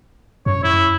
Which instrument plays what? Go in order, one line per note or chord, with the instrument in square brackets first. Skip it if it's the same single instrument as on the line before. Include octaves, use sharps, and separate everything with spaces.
[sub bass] F#2 [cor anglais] C#5
[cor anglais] E4